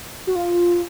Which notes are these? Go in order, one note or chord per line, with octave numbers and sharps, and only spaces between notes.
F#4
F4